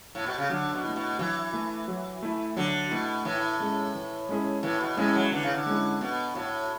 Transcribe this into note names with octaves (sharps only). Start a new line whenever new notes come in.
A2
B2
C#3
D3 F#3
B2
A3 E4
B2
E3 F#3
A3 E4
F#3
A3 E4
D3 F#3
B2 A3 E4
A2 E3
G#3 C#4 E4 G#4
E3
G#3 C#4 E4 G#4
A2 E3
B2
A2 G#3 C#4 E4 G#4
F#3
D3 E3
C#3
D3
G#3 C#4 E4 G#4
B2 B3
A2 F#4 C#5